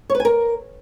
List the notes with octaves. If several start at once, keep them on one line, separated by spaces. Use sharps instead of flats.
C#5
B4
G#5
A#4